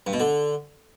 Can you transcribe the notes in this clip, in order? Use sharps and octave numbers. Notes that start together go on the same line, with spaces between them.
G2
B2
D3